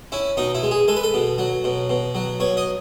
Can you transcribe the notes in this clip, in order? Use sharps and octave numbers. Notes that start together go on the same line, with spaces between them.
C#4 E4
B2 D#4
E4
G#3
G#4
G#3 A4
B4
A4
B2
F#3
B2
B2
F#3
B2 C#5
D#5